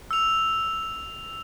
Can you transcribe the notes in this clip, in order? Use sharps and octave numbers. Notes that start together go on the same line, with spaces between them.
E6 F7